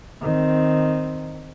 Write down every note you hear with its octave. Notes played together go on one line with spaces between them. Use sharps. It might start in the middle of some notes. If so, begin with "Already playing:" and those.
D#3 C4